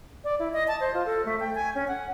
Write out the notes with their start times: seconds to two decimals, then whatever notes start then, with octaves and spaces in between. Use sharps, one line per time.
0.24 D5
0.39 E4
0.53 D#5
0.68 A5
0.80 C5
0.94 F4
1.06 A4
1.25 A3
1.40 G5
1.55 G#5
1.75 C#4
1.88 F#5